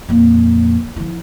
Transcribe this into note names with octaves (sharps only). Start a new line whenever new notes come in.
F2 A#2
F3 E4